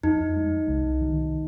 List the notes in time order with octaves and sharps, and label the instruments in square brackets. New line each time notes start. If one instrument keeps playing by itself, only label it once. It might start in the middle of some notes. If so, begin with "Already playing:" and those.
[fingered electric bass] F2 [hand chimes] D#4
[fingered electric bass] G#3
C2
D#3